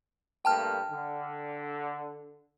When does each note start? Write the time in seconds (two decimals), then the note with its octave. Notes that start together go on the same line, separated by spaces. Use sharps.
0.45 G2 A3 A#3 G5 A5 F6
0.88 D3